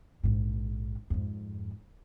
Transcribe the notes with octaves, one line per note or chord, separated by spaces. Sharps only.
A#1 G#2
F2 G#2